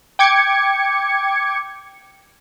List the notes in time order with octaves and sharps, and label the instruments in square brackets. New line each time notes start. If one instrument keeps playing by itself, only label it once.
[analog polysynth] G5 D6 G#6 C#7